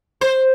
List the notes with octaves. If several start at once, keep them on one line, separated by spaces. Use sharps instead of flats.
C5